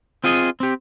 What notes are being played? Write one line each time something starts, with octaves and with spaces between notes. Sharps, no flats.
C4 F4 G#4 D#5
C4 G4